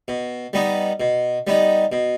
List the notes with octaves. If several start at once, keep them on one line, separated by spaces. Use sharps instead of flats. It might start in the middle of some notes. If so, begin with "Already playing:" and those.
B2
G3 B3 D#4
B2
G3 B3 D#4
B2